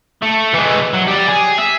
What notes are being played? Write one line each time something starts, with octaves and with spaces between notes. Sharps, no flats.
A3
E3 G#3
F#3
G4 D5
G#4
E5